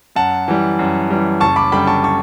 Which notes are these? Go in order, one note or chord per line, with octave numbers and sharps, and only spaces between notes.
F#2 F#5 A5
E3 G3
F#2
E3 G3
F#1 A5 C#6
B5 D6
F#2 D3 G3 G5 B5
A5 C#6
A5 C#6